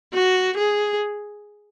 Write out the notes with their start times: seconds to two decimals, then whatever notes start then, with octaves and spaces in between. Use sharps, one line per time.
0.14 F#4
0.57 G#4